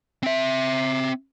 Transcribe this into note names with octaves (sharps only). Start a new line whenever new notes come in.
C4 E5